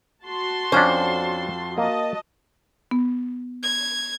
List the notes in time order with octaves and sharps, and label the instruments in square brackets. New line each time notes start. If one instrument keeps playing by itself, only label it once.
[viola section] F#4 A5 C6
[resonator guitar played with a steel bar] F2 C5 [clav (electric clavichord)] C#4 D4
[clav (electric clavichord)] A#3 [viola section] F#4 D#5 A5
[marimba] B3
[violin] G#6